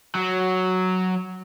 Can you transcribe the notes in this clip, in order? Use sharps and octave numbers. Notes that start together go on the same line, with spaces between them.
F#3